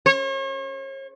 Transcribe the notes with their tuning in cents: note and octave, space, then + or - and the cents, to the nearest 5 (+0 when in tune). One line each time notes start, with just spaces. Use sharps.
C#5 -40